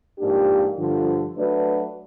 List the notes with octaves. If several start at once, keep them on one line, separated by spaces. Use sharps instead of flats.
G#2 F3 A#3 D4 G4
G2 D3 F3
F#3 A3 D4 F#4 B4